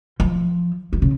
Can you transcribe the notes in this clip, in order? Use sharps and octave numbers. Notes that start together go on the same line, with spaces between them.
F3
D#3
C#3